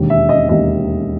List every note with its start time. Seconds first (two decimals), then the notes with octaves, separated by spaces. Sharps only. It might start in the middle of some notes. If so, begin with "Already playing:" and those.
Already playing: E1 D#2 D#3
0.10 E5
0.29 D#5
0.49 E1 D#2 D#3 D#5